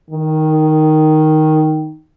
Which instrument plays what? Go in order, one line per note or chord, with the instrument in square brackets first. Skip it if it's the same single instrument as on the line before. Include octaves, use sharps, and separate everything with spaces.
[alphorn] D#3